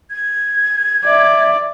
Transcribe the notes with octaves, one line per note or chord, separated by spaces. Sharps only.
G#6
D5 E5